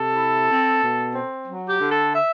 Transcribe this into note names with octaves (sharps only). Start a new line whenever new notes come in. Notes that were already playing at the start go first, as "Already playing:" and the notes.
Already playing: C3 A4
E4
C4
B2
C4
F#3
G4
D3
A4
E5